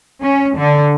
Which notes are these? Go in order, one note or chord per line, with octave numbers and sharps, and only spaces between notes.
C#4
D3